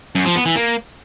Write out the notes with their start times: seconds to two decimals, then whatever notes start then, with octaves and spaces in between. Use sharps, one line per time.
0.15 F#2
0.25 F3
0.36 B3
0.46 E3
0.56 A#3